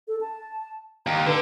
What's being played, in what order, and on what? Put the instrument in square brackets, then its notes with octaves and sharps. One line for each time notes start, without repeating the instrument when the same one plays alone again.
[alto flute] A4
A5
[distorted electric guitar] D#2 [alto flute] A#5
[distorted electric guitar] D3 [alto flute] B4